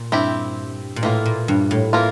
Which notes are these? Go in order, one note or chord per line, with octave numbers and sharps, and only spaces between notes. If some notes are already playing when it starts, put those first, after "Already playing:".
Already playing: A#2
G2 C4 E4 G4
A#2
A2 E3 A#3 F4
A#2
G2
A2
E3 A#3 F4